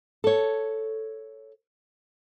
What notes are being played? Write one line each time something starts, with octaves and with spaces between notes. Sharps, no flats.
A4 C#5